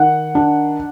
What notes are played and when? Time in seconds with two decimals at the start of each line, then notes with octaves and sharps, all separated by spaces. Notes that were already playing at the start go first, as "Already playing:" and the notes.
Already playing: D#3 F#5
0.35 D4